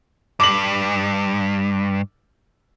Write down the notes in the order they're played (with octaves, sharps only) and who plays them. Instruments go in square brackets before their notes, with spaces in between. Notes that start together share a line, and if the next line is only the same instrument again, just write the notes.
[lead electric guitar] G2 [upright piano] D6 F#7